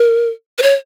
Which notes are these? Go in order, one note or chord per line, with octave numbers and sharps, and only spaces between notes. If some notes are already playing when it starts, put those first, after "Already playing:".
Already playing: A#4
B4
C#5